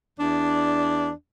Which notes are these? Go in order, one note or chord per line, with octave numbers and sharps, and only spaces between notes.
E2 D4